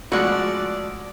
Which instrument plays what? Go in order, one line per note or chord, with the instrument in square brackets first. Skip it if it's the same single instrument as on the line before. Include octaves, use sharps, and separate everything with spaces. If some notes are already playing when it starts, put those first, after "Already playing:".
[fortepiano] F3 G#3 A3 [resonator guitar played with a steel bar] F#4 F#5 [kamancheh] D5